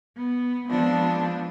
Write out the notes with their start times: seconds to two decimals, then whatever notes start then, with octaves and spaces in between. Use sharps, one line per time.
0.17 B3
0.69 F3 G#3 B3 C4 D4 F4